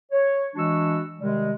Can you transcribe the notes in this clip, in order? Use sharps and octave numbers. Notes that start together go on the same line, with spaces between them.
C#5
E3 G#3 D4 F#4 C#6 E6
C3 D#3 G3 G#3